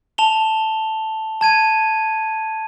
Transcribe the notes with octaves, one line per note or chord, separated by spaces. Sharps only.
A5 F7 G7
A5 G#6 D#7